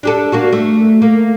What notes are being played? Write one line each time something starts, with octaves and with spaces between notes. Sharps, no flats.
D4 G4 A4
A#3 D4 F#4
A3
A#3